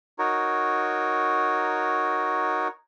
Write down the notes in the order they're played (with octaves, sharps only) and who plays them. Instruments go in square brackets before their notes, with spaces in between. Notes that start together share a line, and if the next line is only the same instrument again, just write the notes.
[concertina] D#4 F#4 A#4 C#5